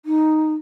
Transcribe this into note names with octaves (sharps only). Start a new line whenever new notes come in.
D#4